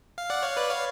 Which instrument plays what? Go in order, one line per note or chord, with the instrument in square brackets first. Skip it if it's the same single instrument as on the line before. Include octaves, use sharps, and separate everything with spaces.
[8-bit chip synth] F5
D5 F#5
C#5 F5
B4 D5
C#5 F5